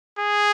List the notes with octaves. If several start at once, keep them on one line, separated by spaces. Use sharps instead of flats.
G#4